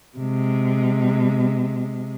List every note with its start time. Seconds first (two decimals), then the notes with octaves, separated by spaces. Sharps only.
0.18 C3 G#3